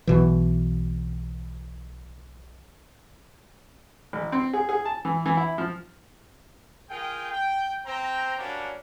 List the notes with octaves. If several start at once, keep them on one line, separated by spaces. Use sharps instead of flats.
B1 B2 E3
A1
C4
G#4
G#4
A5
E3
E3
E4
F3
F4 G#4 A#4 G5
G5
C4 G5 A#5
F#3 G3 A#3 C#4 D4